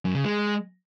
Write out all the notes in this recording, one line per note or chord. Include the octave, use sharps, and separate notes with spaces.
F#2
C#3
G#3